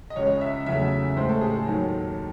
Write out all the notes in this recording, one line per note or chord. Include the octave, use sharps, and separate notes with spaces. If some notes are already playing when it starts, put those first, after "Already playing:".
D#5
C#2 C#3 G#3 C#5
D#5
E5
E2 C#3 F#3 A3 E5
A2 G#3 C5
A4
G#4
A4
D#2 D#3 F#3